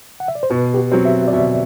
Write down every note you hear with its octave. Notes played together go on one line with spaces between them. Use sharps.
F#5
E5
D5
C5
B2 B4
G4
F#4
F#3 C4
E5
D5
B2 E5